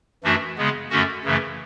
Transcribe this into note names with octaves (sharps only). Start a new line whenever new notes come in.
F#2 E3 A3 D4 F#4
C#3 G#3 B3
F#2 D3 A3 C#4 F#4
F#2 C#3 E3 A3